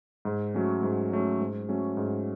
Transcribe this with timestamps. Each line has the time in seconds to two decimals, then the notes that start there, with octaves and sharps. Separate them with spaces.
0.25 G#2
0.54 F#3 A3 C#4
0.83 G#2
1.12 F#3 A3 C#4
1.40 G#2
1.68 F#3 A3 C#4
1.97 G#2